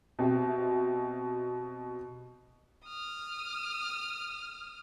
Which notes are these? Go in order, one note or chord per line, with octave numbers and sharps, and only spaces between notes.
B2 C4 G4 E5
D#6 F6